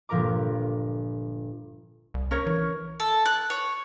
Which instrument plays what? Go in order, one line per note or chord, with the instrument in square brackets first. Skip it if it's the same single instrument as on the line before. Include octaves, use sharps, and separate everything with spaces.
[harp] G1 A#2 F3 A#4 A#5 D6
[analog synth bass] C2
[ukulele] C#4 A#4 C#5
[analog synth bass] E3
[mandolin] A4
F#6
C#5